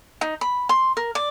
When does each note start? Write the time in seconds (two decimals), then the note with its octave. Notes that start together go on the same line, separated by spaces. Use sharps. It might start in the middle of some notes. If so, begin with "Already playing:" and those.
0.21 D#4
0.41 B5
0.69 C6
0.97 A#4
1.15 D5